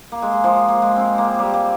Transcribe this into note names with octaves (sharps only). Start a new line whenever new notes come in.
A#3
G#3
G#3
F3
A#3
G#3
C4
A#3
G3
A#3